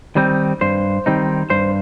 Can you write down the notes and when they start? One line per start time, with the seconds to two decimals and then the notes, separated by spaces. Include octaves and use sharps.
0.16 D#3 G3 C4 D#4
0.61 G2 C5
1.06 D#3 G3 C4 D#4
1.50 G2 C5